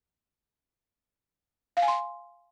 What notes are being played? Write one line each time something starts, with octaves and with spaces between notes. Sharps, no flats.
F5
G#5
C6